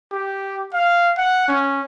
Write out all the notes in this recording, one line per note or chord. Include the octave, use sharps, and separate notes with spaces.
G4
F5
F#5
C#4